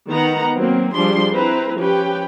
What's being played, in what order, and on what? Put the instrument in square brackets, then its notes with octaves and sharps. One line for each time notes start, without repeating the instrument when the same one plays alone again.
[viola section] D#3 B3 D#4 F#5 A#5
F#3 A#3 C4
F3 G3 D4 G#4 C6
C4 E4 B4 C5 A#5
F3 C#4 G4 B4 G5